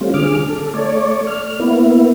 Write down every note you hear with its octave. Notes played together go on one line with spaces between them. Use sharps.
G3 A3 C4 C#4 F4
D3 G#4 D6 F6
A4
A3 C#5 D5
F6
A#3 B3 E4